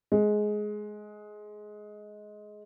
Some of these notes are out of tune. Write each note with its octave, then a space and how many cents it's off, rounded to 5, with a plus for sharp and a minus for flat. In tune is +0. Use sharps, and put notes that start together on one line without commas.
G#3 +15